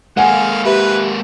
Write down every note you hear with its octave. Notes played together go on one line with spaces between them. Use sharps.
G#3 A#3 G#4 A4 F5 F#5 G#5
G4 B4 E5 B5